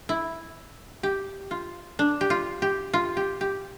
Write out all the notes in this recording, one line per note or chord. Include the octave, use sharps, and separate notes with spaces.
E4
G4
F4
D4
G4
F4
G4
F4
G4
G4